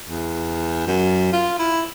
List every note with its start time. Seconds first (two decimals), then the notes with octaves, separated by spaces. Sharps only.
0.09 E2
0.87 F#2
1.33 F4
1.59 E4